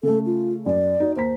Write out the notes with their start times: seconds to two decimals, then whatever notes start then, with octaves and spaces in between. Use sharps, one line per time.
0.03 C#3 A3 A4
0.26 F4
0.66 F#2 D5
1.00 D#4 F#4
1.16 D#2 C5 A#5 B6